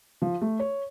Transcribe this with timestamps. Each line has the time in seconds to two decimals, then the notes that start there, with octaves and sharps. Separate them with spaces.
0.22 F3
0.41 A3
0.59 C#5